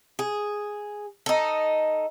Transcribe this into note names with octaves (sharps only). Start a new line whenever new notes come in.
G#4
D#4 A4